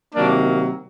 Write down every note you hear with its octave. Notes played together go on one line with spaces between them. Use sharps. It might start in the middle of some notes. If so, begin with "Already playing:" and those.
C3 D#3 F#3 A#3 D4 D5